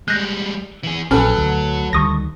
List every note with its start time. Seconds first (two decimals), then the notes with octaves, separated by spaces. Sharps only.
0.08 G3 G#3 F#6 G6 A#6
0.83 E3 G#4
1.11 A#1 F#3 C#4 A4 B4 F6
1.37 D2
1.93 D2 D#3 G3 C#6 D#6 A#6